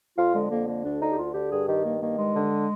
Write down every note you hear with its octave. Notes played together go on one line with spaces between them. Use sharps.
F2 F4
D3 G#3
F2 A#3
D3 A#3
D2 D4
D3 D#4
G4
D2 F4
D3 G4
G2 G#4
D#3 G4
G2 A#3
D#3 A#3
G2 G#3
D3